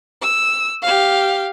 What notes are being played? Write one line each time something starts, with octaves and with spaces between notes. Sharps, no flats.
E6
G4 F5